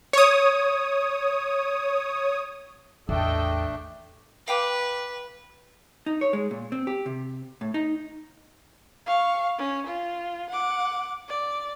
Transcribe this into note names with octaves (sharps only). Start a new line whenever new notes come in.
C#5 D#6
A1 E2 A3 D4 A4 D#5 G5
B4 F5 G5 D6
D#4
C#5
G#3
A#2
C4
G4
C3
A2
D#4
F5 C#6
C#4
F4
F#5 D6
D5